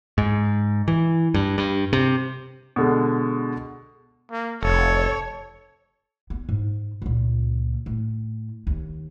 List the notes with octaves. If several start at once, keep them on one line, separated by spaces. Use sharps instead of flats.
G#2
E3
G2
G2
C3
B2 D3 G#3
A#3
F1 A4 C#5
B3
G#2
C#2 A#2
A2
D#2